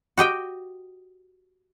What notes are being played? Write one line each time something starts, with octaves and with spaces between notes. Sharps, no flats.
F#4 G4 D#5 G5